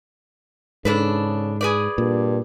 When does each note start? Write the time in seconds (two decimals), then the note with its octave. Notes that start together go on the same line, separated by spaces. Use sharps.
0.85 G#2 C#3 D4 A4 B4
1.61 G#4 B4 D5
1.98 G2 A#2